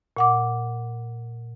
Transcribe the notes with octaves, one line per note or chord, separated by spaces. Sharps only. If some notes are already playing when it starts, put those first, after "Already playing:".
A#2 F#5 D6